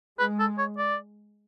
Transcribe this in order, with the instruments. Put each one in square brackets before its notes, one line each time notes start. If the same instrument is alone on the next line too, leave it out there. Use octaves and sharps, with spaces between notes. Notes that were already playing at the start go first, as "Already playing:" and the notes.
[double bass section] G#3 [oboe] B4
[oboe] A4
C#5
D5